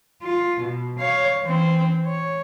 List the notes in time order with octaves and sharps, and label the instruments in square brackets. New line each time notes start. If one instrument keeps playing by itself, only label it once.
[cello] F4
B2
C#5 F5
E3 C4
C#5